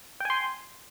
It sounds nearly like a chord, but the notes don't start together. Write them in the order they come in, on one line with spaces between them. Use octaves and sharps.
G5 G#5 C6